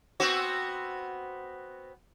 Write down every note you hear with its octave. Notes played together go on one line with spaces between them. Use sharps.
B3 C4 F#4